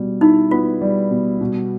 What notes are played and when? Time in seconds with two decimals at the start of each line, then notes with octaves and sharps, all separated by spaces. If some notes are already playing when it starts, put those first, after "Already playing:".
Already playing: B2 G3
0.21 D#4 E4
0.51 B3 F4
0.81 G3
1.11 B2
1.41 B2